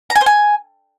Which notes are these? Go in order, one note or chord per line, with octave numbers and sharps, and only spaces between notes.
A#5
G#5
C5
G#5